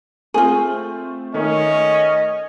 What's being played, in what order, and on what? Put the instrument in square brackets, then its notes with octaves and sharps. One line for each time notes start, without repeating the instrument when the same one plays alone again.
[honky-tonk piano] A3 C4 [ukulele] F4 G#4
[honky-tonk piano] D#3 A3 [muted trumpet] C#4 [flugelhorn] D#5